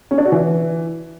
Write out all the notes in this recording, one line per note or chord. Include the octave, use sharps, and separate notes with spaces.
C#4
D4
F#4
E3